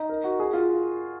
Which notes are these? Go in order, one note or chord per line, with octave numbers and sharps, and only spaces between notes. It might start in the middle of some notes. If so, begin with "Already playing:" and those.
Already playing: D#4
A#4
F#4
G#4
F4